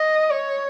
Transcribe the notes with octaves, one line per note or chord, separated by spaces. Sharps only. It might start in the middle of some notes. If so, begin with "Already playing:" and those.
Already playing: D#5
C#5